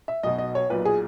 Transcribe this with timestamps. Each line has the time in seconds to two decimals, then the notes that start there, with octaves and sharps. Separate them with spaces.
0.08 E5
0.23 B1 B2 D#5
0.38 D#5
0.55 C#5
0.70 B1 A#2 B4
0.85 G#4